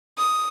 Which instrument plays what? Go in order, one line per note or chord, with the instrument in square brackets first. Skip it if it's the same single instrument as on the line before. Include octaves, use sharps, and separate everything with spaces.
[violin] D#6